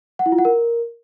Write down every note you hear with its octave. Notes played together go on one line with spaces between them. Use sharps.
F#5
E4
F4
F#5
A#4